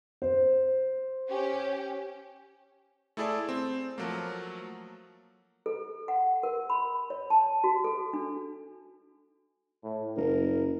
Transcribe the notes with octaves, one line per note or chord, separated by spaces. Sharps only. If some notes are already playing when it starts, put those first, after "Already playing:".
C5
C#4 G4
A3 E4 G#4 A4 D5
C4
F3 F#3 A3 A#3
A4
F#5
A#4
B5
C#5
A5
F#4
A4
D4
A2
F#1 A#4